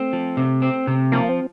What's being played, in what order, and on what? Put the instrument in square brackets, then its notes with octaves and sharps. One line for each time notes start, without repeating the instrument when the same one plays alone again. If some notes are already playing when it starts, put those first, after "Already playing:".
Already playing: [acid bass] A3 [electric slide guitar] C4
[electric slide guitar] F3
C3
C4
C3
[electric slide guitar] F3 [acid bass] A#3
[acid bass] C4